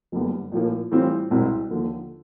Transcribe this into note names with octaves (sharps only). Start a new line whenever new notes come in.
F#1 F#2 D3 G3 B3
A#1 A2 F3 A#3
A2 E3 G3 C4 F4
C2 B2 G#3 C4 E4
D#2 D3 F3 A#3 D#4